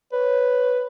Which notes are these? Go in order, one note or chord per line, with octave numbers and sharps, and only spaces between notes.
B4 C#5